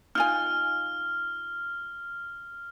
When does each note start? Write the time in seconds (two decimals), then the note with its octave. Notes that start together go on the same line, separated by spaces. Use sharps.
0.15 D#4 F4 G#5 F6